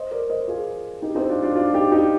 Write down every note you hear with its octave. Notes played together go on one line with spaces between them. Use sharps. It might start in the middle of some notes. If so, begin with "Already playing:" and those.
Already playing: C5 D#5
A#4 D5
C5 D#5
F4 G#4
D#4 G4
C4 D#4
D4 F4
D4 F4
D4 F4
D#4 G4
D#4 G4